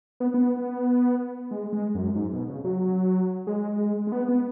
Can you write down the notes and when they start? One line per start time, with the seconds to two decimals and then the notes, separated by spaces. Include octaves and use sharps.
0.20 B3
0.34 B3
1.51 G#3
1.73 G#3
1.95 F#2
2.15 G#2
2.33 B2
2.49 C#3
2.64 F#3
3.47 G#3
4.07 G#3
4.12 B3
4.28 B3